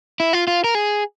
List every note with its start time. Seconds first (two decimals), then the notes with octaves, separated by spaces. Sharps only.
0.20 E4
0.33 F4
0.47 F4
0.64 A#4
0.75 G#4